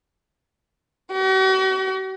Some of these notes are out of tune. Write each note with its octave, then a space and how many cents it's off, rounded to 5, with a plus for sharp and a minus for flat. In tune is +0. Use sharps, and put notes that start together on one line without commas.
F#4 +45